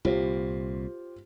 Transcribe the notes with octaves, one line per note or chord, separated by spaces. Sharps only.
C2 A#2 F4 G4 C5